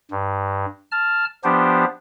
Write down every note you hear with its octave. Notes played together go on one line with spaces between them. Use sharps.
G2
A5 F6
F3 B3 D4 G4 C5